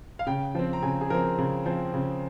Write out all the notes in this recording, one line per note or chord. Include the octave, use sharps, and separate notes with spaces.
F5
C#3 G5
F3 C4
A#5
C#3 G#5
G#4
F3 C4 A#4
C#3
F3 C4
C#3